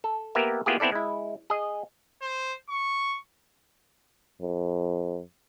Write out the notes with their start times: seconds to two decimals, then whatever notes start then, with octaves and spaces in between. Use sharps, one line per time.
0.04 A4
0.35 A#3 B3 G4 A#4 B4 E5
0.66 A#3 B3 E4 F4 G4 G#4
0.80 B3 C4 E4 A4 D5
0.92 G#3 E4
1.50 G#4 D#5
2.22 C5
2.70 C#6
4.42 F2